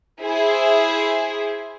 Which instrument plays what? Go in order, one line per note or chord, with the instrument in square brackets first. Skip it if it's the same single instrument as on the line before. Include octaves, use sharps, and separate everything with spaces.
[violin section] E4 G#4 C5